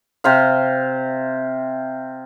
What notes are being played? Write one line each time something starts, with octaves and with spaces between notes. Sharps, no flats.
C3 C5 F5